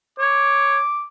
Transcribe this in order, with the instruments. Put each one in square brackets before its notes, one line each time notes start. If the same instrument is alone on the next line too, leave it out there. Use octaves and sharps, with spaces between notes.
[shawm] C#5 [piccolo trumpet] D6